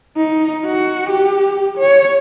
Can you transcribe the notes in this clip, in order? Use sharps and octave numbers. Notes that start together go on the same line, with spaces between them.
D#4
F#4
G4
C#5